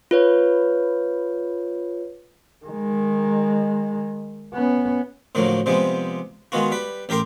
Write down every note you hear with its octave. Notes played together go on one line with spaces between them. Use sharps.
F4 B4 C#5
D#3 G#3
B3 C#4
A2 D3 F3 F#3 A#3
C3 F3 G3 G#3 B3
D#3 G#3 B3 F4 F#4
G3 B4
A1 G4 A#4 G5 C6 D6